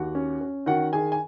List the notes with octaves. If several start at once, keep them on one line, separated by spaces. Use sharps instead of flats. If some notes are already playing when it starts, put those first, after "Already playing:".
Already playing: D#2 F#4 F#5
C#4
C#4
D#3 F#4 F#5
D#3 G#4 G#5
G#5